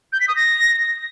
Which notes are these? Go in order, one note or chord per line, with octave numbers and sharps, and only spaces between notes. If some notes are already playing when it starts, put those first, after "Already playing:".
G6
B6
D#6
A#6